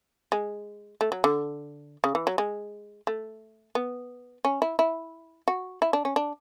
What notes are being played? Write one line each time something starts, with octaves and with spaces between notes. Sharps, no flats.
G#3
A3
F#3
D3
C#3
E3
F#3
G#3
A3
B3
C#4
E4
E4
F#4
E4
D4
C#4
D4